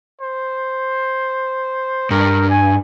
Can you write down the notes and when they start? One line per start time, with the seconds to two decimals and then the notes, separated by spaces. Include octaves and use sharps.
0.20 C5
2.10 G2 A#4
2.50 G#5